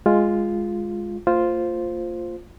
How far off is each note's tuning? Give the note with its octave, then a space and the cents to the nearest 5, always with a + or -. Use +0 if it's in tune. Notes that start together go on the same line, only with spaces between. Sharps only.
G#3 -5 F4 +0
A#3 -40 F4 +0 C5 +0